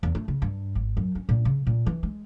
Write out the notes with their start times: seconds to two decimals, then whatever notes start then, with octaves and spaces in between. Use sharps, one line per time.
0.03 E2
0.15 A3
0.28 C#3
0.42 G2
0.75 G#1
0.97 F#2
1.15 C#4
1.29 A#2
1.45 C#3
1.67 A#2
1.86 E3
2.03 G#3